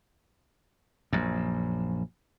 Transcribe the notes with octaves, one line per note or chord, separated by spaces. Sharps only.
A#1 F#2